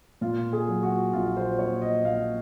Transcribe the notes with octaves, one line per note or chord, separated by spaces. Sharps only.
A#2 F4
G#4
F#3
F#4
A#1 F4
C5
A#1 C#5
D#5
A#1 F5